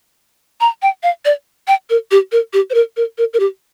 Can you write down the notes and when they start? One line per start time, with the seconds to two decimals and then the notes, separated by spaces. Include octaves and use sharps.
0.61 A#5
0.82 G5
1.03 F5
1.25 D5
1.68 G5
1.90 A#4
2.11 G4
2.32 A#4
2.53 G4
2.70 C5
2.74 A#4
2.97 A#4
3.18 A#4
3.33 A#4
3.40 G4